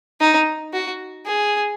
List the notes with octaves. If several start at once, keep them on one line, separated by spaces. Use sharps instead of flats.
D#4
F#4
G#4